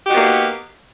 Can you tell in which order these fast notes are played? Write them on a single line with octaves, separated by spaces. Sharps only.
G4 D#4 F#4 B3 A#3